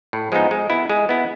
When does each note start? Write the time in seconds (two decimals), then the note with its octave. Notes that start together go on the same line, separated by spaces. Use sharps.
0.13 A2
0.32 F3 G#3 B3 D#4
0.51 G#3
0.70 B3 E4
0.90 G#3
1.09 B3 E4